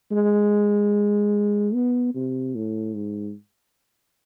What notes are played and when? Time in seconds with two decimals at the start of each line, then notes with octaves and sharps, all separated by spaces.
0.11 G#3
1.74 B3
2.15 C3
2.55 A2
2.96 G#2